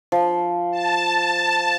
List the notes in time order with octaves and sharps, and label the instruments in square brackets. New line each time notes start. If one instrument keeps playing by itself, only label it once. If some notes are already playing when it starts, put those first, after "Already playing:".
[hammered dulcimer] F3
[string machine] A5